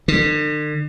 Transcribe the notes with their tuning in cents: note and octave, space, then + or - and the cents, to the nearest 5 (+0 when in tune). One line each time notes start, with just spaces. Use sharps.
D3 +45